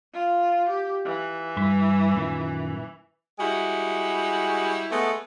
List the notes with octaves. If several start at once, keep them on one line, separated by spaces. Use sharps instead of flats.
F4
G4
E3
G2 B4
F#2 A#2 D#3
G3 G#3 E4 F#4
G#3 A3 B3